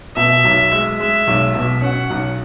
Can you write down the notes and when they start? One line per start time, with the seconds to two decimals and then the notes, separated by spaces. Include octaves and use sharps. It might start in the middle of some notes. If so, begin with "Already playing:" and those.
0.17 B2 E5
0.44 B1
0.72 G#3
0.99 G#3 E5
1.27 B1
1.55 B2
1.82 C#4 F#5
2.10 B1